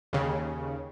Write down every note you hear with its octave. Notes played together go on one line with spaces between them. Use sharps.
D#2 C#3